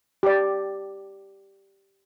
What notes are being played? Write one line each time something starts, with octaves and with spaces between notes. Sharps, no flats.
G4 D5